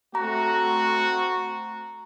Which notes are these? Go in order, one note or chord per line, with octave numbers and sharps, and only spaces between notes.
A3 C4 F#4 A#5